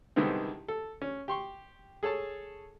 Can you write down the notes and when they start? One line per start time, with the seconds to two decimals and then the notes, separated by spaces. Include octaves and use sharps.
0.16 C2 D3 D#3 G#3 B3 C4
0.68 A4
1.02 C#4
1.28 G4 C6 C#6
2.03 G#4 A4 C#5 A5